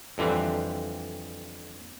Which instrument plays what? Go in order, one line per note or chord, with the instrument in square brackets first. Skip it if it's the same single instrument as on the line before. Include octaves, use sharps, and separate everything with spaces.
[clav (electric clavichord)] F2 D3 E3 G3 C4